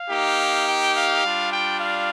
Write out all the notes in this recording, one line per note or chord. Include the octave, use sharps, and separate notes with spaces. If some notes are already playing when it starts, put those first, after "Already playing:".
Already playing: F5
A#3 D#4 G4
G5
F5
G3 D4 F4
G5
F5